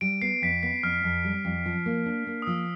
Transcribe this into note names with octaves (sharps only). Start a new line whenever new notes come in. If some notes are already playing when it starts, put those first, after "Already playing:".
G3 D7
B3 C7
F2 B6
B3 B6
F2 F6
F2
G3
F2
F3
A#3
D4
A#3
D#6
F3 E6